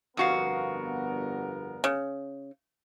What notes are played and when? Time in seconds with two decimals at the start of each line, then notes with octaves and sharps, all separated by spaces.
0.17 G1 F2 B3 F#4 A#4 F5
1.84 C#3